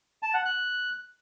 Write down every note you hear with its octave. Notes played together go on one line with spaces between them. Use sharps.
A5
F#5
F#6